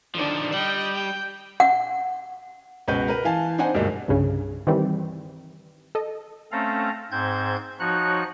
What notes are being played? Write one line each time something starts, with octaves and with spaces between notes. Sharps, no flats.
D3 D#3 F3 D4
G3 D#5 G5
G5
F#5
C#2 B2 F#4 B4 G6
A#4 B4
E3 F5 G#5 A5
C4 D4 D#4 C5 F#5 G#5
D2 G2 B2 G#3 A#3
C2 G2 C#3
D#3 E3 G3 C4
A4 D#5
A3 C4 C#4 A4 F5 A#5
G#2 C4 C5 G6 G#6
F3 D#4 F#4 C#5 F#6